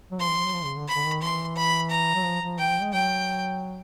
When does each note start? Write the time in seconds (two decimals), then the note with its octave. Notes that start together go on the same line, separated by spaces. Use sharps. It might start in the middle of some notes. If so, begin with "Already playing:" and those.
0.11 F#3
0.20 F3 C6
0.28 E3
0.37 F3
0.45 F#3
0.54 F3
0.65 C#3
0.76 D3
0.88 B5
0.95 D3
1.05 D#3
1.22 E3 C6
1.56 B5
1.90 A#5
2.15 F#3
2.24 F3
2.42 F3
2.58 E3 G5
2.70 F3
2.82 G#3
2.93 F#3 G5